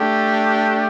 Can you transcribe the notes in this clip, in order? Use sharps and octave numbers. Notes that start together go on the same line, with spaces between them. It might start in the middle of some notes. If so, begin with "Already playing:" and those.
Already playing: A3 D4 G4